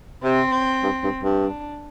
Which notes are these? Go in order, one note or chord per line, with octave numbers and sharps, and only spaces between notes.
C3 C4
G2
G2
G2
D4